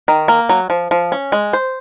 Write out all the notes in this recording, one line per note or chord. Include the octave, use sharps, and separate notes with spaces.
D#3
A#3
F#3
F3
F3
C#4
G#3
C5